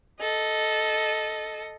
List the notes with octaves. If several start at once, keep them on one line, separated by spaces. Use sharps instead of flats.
A4 D#5